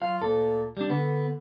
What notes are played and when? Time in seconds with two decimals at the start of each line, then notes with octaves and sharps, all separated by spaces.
0.02 F#3 F4 F5
0.22 D2 A#2 A#3 A4
0.77 G3 D4
0.90 D3 B3